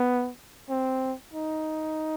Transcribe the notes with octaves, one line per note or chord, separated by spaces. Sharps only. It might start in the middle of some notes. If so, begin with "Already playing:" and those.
Already playing: B3
C4
D#4